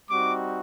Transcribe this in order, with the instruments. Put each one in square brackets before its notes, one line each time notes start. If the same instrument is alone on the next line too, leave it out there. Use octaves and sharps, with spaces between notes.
[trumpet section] G3 C4 D#4 F#4 D6